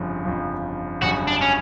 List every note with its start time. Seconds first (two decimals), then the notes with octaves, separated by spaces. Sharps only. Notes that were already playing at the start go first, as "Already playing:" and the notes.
Already playing: G1 F2 C#3 F3
0.25 G1 F2 C#3 F3
1.01 G1 F2 C#3 F#3 F#4
1.27 D4
1.41 C#4